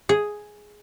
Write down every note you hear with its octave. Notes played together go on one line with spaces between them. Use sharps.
G#4